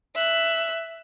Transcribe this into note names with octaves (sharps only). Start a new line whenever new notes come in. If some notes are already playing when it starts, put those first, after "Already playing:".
E5 F#6